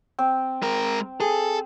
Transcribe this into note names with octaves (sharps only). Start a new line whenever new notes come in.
C4
G#3 A#4
G#4 A4